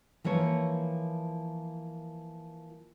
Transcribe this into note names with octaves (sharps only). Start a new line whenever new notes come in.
E3 F3 A#3 C#5